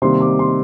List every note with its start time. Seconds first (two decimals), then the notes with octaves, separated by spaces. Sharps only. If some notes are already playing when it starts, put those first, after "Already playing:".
0.02 C3 D#3 G3 A#3 C6
0.20 D6
0.39 C6